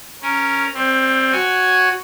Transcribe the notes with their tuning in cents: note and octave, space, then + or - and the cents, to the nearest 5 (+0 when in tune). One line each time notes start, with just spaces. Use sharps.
C#4 +0 A#4 +0
G3 +0 C4 +15
F#4 +0 C#5 +0 G#5 +0